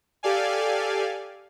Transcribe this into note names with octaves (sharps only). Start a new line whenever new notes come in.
G4 A4 D5 F5 G#5